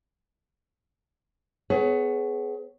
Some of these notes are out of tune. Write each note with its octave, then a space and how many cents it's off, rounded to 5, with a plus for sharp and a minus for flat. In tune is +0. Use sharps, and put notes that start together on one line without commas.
B3 +25 G#4 +25 C#5 +0